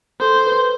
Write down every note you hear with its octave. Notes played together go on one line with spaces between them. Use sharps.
A4 C5
B4